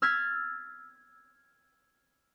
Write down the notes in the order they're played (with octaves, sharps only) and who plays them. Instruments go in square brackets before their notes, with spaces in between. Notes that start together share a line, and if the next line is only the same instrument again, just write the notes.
[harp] E6 F6 G#6 A6 B6